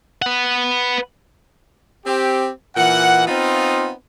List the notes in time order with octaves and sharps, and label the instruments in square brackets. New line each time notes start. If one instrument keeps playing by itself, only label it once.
[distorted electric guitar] B4 F#5
[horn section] C4 G4
A#2 E3 F#5
B3 C4 D#4 F4